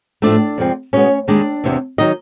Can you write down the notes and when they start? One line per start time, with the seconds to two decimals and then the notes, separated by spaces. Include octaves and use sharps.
0.22 A2 F3 A3 D4 D5
0.58 F2 C3 F3 G#3 C4
0.93 B2 G#3 B3 C#4 C#5
1.28 D#2 D#3 G#3 D4 D5
1.64 E2 C3 E3
1.98 D#3 F#3 D#4 D#5